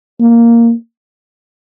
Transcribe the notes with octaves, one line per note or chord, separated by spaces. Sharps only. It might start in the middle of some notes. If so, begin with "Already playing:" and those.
A#3